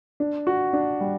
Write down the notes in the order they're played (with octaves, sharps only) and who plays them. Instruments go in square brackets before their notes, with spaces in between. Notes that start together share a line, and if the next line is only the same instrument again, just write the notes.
[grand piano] D4
F#4
D4
G3